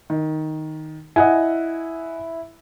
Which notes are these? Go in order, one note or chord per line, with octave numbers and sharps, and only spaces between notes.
D#3
E4 D#5 F#5 G#5